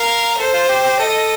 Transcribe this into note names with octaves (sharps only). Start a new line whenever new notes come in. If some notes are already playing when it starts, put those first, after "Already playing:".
Already playing: A#4 F5
A4 C5
F4
G4
G4
A4 D#5